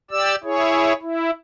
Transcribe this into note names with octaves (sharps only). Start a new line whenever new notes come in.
G4 D5 E6
E4 G#4 C#5
E4